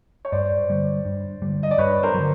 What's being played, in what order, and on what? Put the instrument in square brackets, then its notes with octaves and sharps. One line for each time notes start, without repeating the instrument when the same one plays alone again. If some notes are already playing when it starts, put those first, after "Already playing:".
[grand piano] C#5
[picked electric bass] G2 [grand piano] C5 D5
[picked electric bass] D3 G3
G2
D3 G3
[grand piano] D#5
D5
[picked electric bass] G2 [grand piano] B4 C#5
[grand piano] A#4 C5
[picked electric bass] D3 F#3